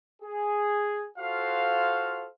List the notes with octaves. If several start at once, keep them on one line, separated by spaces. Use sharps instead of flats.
G#4
F4 F#4 A4 C5 F5